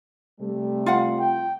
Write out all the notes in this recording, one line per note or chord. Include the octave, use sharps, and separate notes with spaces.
C3 G3 A3
F4 F5 F#5
G5